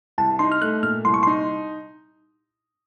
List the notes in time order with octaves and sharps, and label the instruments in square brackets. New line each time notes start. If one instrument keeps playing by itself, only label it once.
[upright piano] C2 [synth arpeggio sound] A5
[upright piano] D#4 [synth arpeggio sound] C6
[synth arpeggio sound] F6
[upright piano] A3 [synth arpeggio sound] F#6
[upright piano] A#2 [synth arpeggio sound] F6
[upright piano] C2 [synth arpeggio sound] C6
[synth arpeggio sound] C#6
[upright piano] D#4 [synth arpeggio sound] C6